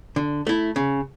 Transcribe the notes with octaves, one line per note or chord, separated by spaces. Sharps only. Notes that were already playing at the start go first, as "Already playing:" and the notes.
D3
A3 E4
C#3